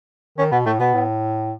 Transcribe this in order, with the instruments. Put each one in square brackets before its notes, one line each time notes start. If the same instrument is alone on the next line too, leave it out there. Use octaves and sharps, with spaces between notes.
[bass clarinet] D#3 [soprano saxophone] C#4
[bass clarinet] B2 [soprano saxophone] B3
[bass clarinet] A2 [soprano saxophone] A3
[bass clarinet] B2 [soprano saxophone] B3
[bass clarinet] A2